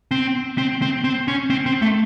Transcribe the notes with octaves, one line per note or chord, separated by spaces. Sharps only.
C4
C4
C4
C4
C#4
C4
C4
A3